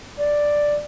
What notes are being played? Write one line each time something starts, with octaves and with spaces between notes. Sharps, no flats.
D5